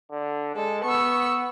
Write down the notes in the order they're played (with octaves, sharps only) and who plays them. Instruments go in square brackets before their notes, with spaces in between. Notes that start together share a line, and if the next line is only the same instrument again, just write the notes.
[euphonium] D3
[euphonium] G#3 [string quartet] A4
[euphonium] B3 [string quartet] C#6 E6